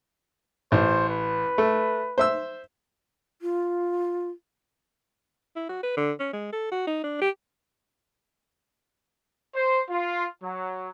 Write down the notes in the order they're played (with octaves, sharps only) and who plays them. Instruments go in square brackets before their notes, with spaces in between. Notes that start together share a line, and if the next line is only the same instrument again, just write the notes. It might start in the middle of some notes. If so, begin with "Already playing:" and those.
[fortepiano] A1 [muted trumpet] C5
[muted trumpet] B4
[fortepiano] A3
C5 E5 E6
[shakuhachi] F4
[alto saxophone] E4
F#4
B4
D3
C#4
G#3
A4
F#4
D#4
D4
G4
[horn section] C5
F4
F#3